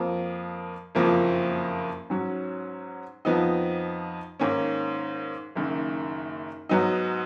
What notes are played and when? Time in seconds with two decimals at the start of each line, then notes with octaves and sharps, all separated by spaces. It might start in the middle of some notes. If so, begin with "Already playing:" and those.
Already playing: F2 F3 A#3
0.95 F#1 F2 F3 A#3
2.10 G#2 F#3 C#4
3.25 F2 F3 B3 D#4
4.40 G#2 D#3 A#3 C#4
5.55 F#1 F#2 D#3 A#3
6.69 G#2 F#3 B3 D#4